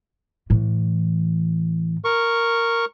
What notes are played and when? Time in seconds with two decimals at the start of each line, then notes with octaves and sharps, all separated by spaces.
0.50 A2 E3
2.05 A#4 C#6